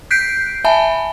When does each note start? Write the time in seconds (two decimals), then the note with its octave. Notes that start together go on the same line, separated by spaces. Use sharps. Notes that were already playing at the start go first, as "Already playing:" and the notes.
0.11 F#6 G6 B6 C7 D7
0.64 E5 G#5 A5 B5